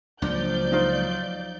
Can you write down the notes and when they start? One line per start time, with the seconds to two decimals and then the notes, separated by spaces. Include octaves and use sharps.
0.22 C#2 C#3 F3 F#3 A#3 D4 D5 G6
0.72 D#4 F4 C5